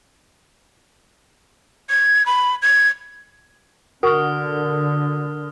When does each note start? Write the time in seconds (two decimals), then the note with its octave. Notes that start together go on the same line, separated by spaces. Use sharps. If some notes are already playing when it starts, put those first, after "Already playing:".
1.90 G#6
2.26 B5
2.62 G#6
4.03 D3 F#4 A#4 D#6 F6